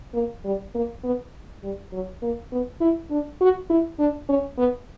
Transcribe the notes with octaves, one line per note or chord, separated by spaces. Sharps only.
A#3
G3
A#3
B3
G3
F#3
A#3
B3
E4
D4
F#4
E4
D4
C#4
B3